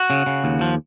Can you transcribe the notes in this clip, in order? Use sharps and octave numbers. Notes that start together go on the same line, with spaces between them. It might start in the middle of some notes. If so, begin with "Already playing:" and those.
Already playing: F#4
C#3
C#3
D#2
F3